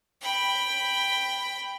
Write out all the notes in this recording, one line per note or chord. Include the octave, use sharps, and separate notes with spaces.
G5 B5